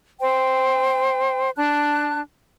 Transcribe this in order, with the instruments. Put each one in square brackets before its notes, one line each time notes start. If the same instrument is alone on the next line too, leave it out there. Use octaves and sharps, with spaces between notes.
[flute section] C5 G5
D4 A5 F#6